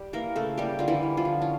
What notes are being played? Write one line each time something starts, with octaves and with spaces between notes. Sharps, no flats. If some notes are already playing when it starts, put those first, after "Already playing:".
Already playing: G3 G4
E3 A#3 A#4
C#3 A3 A4
G3 A#3 G4
D3 F4
E3 E4
G3
F3 F4
D3
C#4